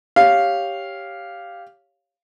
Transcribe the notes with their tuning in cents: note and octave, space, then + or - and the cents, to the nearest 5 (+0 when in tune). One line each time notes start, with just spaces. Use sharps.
G4 +0 C#5 +0 F5 +0